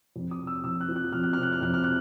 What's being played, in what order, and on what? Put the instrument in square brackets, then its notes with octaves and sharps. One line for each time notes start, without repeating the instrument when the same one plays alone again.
[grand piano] F2
D#6
C3
E6
F2 E6
F#6
F3
F#6
F2 F6
F#6
C3 F6
F#6
F6
F2 F#6
F6
F#6